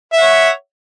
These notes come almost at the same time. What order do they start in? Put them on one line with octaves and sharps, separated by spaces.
E5 F#5 C#5